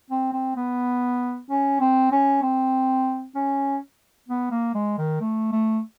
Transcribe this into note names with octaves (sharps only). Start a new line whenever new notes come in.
C4
C4
B3
C#4
C4
C#4
C4
C#4
B3
A#3
G#3
D#3
A3
A3